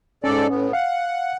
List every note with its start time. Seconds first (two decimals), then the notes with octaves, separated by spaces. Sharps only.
0.24 G#2 C#4 A4 D5
0.49 A2 B3
0.73 F5 F#5